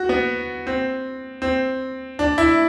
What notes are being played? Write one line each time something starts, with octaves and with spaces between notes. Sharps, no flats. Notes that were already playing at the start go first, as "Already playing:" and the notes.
Already playing: F#4
B3
C4
C4
D4
E4